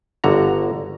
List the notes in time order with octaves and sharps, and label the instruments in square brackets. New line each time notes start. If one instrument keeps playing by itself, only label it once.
[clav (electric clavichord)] G1 D3 F#4 A#5